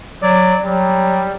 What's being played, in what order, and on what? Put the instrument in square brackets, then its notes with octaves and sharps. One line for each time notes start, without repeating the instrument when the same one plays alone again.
[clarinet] F#3 [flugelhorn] D5
[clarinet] F#3 [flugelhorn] G3